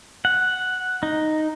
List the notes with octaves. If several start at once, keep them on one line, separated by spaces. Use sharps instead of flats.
F#5
D#4